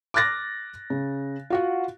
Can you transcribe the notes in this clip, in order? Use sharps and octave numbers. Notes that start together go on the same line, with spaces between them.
D6 F6 F#6 A6 A#6
C#3
F4 F#4 F#5